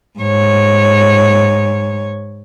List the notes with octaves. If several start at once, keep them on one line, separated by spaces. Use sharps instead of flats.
G#2 C#5